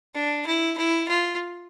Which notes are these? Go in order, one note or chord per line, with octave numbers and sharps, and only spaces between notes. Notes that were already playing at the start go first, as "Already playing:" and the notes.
D4
E4
E4
F4